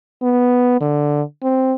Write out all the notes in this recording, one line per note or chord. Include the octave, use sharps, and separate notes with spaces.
B3
D3
C4